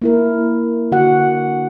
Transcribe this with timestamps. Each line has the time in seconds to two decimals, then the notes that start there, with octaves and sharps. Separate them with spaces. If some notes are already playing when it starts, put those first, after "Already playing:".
0.02 A#3 E4 A#4
0.92 D3 F#4 F#5